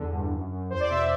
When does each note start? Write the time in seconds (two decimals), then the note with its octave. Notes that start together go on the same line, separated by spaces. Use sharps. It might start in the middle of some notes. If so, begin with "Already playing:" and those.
Already playing: E2 D3
0.12 G2
0.32 F#2
0.51 F#2
0.70 E2 C5
0.80 D5
0.90 B2 E5